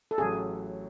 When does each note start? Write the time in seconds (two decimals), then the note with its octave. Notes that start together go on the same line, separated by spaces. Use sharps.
0.11 A4
0.18 A1 A2 F#3 G#4